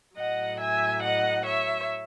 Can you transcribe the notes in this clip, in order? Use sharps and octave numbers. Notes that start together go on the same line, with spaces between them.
A2 F#3 D#5 F#5
E5 G#5
D#5 F#5
C#5 E5